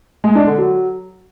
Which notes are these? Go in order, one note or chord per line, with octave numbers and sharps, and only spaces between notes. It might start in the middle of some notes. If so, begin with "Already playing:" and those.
G#3
D4
D3
F#3